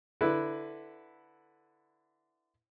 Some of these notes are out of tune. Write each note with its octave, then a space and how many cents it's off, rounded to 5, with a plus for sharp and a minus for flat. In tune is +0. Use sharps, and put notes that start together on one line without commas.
D3 +0 E4 +0 B4 +0